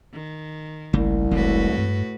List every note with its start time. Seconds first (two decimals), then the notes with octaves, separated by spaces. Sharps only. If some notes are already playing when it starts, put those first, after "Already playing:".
0.13 D#3
0.93 G1 C2 C#3 A3 A#3
1.31 F1 A2 E3 G#3 C4 F#4 B4
1.77 G2